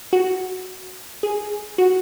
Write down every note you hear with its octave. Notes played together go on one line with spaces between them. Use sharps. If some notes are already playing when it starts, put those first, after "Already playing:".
F#4
G#4
F#4